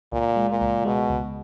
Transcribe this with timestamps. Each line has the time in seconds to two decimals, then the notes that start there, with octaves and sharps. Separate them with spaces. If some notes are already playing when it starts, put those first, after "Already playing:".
0.12 C#2 A#2
0.36 G#3
0.49 A#2
0.61 C#2
0.85 B2 G#3
1.10 C#2